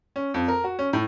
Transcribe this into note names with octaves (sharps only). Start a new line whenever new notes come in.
C#4
F2
A#4
F#4
C#4
A2